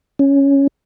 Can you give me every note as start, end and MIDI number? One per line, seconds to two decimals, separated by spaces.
0.19 0.67 61